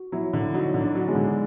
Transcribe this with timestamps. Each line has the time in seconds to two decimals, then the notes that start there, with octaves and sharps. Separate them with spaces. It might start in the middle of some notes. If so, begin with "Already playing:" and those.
Already playing: F#4
0.12 F#3 E4
0.33 D3
0.54 F#3 D#4
0.74 D3
0.81 D4
0.95 F#3
1.08 G#3
1.15 D3